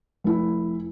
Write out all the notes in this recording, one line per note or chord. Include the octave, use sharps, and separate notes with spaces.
F1 E4